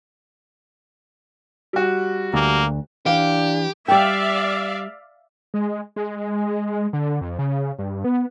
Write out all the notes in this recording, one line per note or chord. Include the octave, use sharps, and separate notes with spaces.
G3 F#4
D2 A#3
E3 D4 G4 F5
G3 D5 E5 F5 G5
G#3
G#3
D3
F2
C#3
G2
B3